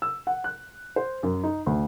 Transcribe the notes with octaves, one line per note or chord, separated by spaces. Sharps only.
E6
F#5
F#6
C5
F#2
D#4
D2